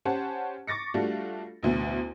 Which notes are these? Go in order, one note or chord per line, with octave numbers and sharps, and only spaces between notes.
C#4 G4 C5 F#5 A5
C#6 D6 A6 A#6 C#7
G3 A3 D4 F4 F#4
A1 D2 B2